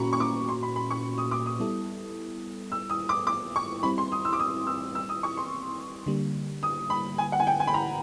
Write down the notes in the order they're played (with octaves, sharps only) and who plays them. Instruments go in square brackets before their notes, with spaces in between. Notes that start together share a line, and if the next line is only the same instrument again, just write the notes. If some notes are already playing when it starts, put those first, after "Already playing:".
Already playing: [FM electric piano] A#2 A#3 C#4 F#4 [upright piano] A#5 B5 C#6
[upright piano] C#6
D6
C6
B5
B5
C#6
D#6
D6
D#6
[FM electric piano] G3 B3 E4 A4
[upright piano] E6
D#6
D6
D6
C#6
[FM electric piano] G3 C4 E4 [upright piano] B5
[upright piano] C6
D#6
E6
D6
D#6
E6
E6
D#6
C#6
C6
[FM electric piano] D3 G3 A#3
[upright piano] D#6
B5
G#5
F#5
G#5
G5
G#5
B5
A#5